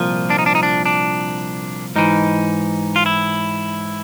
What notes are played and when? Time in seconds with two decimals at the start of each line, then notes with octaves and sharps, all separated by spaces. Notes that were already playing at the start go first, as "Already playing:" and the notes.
Already playing: C2 A#2 F3
0.30 D4
0.39 D#4
0.46 D4
0.55 D#4
0.63 D4
0.86 D4
1.96 G#2 E3 D#4
2.96 F4
3.06 E4